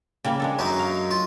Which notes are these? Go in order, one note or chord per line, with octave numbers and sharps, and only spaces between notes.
C#3 G3 A#3
G#3 D4 A4
F#2 F#3 D#4
F5
F4